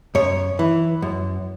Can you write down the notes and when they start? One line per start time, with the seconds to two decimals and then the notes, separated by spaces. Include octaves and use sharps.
0.15 F#2 C#5
0.59 E3
1.02 F#2